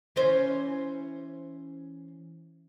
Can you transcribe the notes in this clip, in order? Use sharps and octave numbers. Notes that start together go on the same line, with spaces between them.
E3 C#4 C5